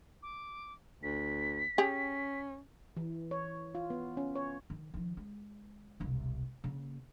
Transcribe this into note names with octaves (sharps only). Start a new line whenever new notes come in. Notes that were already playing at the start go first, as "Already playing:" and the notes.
D6
D2 B6
C#4 G4 G#4
E3
C#5
F4
B3
C#4
C#5
D#3
D#3 F3
G#3
E1 C2
C#3 A#3